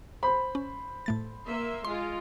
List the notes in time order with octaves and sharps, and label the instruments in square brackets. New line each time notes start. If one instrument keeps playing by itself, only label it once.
[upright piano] C5 B5
[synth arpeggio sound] C#4
A2 A3 A6
[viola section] A#3 E5 C6
[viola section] G#3 F4 [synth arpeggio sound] C6